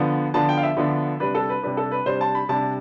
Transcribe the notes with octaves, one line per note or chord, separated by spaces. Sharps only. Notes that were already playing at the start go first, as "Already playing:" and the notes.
Already playing: D3 F3 B3 D4
D3 F3 B3 D4 A5
G5
F5
E5
D3 F3 B3 D4
C3 G3 D4 B4
A4
B4
C3 G3 D4 B4
A4
B4
C3 G3 D4 C5
A5
B5
C3 G3 D4 A5